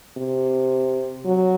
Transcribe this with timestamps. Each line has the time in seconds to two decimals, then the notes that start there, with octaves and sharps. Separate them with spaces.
0.18 C3
1.26 F#3